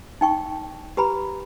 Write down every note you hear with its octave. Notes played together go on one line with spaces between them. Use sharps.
D#4 G5 C#6
G4 B4 A#5 B5